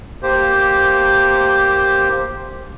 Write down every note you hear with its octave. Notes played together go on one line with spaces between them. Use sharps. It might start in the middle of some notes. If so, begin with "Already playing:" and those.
A#3 G4 C5